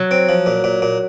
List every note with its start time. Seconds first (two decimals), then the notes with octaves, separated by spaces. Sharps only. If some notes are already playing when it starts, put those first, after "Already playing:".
Already playing: F#3
0.11 C4
0.29 F3
0.46 A#2
0.64 A#2
0.82 A#2